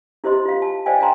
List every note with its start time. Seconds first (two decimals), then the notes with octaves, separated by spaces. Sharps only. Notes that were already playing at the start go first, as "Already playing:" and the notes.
0.24 E4 G4 C5 D#5 C6
0.45 F4 F5
0.62 A5
0.86 C5 D5 D#5 F5 G5 G#5
0.99 D5 F5 G5 G#5 A#5 C6